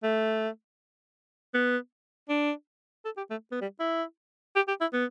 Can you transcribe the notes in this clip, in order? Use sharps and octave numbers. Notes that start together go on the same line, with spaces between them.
A3
B3
D4
A4
G4
A3
B3
G3
E4
G4
G4
E4
B3